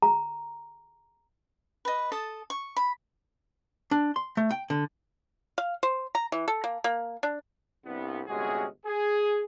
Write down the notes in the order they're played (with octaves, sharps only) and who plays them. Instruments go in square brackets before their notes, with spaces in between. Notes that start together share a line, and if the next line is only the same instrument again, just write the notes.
[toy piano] A#5
[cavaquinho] B4 D#5
A4 A5 D#6
C#6
B5
[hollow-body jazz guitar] D4
C6
A3
G5
D3
[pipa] F5
C5
A#5
E3
A4
A#3
A#3
D4
[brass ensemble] C2 G2 B3
G1 C3 G#3 C#4 F#4 G#4
G#4